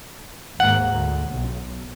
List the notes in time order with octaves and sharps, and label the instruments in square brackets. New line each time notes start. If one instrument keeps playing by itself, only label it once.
[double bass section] D#2 G#2 A#3 [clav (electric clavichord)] F#5
[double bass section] D2
B1